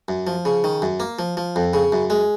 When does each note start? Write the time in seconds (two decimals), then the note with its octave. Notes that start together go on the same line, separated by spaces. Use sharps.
0.08 F#2
0.27 F3
0.45 C#3
0.64 D#3
0.82 F#2
1.00 A#3
1.19 F3
1.37 F3
1.56 F2
1.74 C#3
1.92 F#2
2.10 G#3